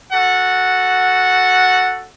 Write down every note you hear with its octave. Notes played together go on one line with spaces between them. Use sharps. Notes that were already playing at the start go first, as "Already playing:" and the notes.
F#4 A4 F#5